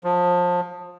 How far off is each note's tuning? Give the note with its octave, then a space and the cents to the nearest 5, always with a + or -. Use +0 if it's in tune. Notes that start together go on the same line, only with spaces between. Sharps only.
F3 +25